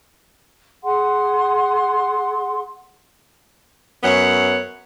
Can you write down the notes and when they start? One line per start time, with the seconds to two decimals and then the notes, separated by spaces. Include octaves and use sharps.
0.83 G#4 F#5 C6
4.04 F#2 B3 C#5 F#5